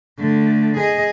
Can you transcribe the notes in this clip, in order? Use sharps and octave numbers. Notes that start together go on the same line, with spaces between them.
D3 A3
G#4 D#5